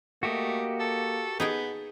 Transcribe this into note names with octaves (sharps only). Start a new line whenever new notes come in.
A3 A#3 F#4 G4 D#5
A4
B3 D#4 G#4 G5